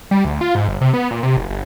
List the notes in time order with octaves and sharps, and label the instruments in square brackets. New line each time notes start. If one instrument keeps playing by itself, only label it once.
[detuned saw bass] G3
D2
F4
G#2
G1
C3
B3
A#2
C3
F#1
G1